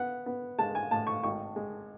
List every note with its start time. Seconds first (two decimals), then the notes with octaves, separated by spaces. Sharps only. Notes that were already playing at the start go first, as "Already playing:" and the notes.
Already playing: B3 F#5
0.26 B3
0.58 G#3 A5
0.75 G#5
0.91 A2 A5
1.07 C#6
1.23 G#1 C#6
1.56 G#3